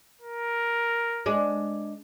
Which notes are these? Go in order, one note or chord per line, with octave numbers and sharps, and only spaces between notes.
A#4
G#3 D4